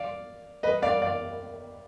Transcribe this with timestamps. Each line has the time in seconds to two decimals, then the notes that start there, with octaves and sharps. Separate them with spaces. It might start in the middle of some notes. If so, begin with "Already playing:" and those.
Already playing: D5 F5
0.63 B4 D#5
0.82 D5 F5
1.02 D5 F5